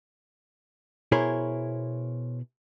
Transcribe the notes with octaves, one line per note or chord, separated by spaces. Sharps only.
B2 E4 G#4 A#4 C5 C#5